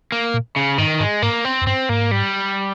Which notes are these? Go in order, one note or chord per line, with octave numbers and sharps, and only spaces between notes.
A#3
A#2
C#3
G#2 D#3
G#2 G#3
G#2 A#3
C4
F2
G2 C4
G#2 A#3
G3